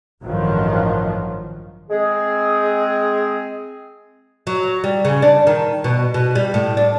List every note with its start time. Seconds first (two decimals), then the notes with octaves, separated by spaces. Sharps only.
0.22 A1 G2 D#3 F3 F#3
1.90 G#3 C4 G#4
4.47 F#3
4.84 G3
5.05 C#3
5.22 D4
5.47 D#3
5.84 B2
6.14 B2
6.35 G3
6.54 A2
6.77 D4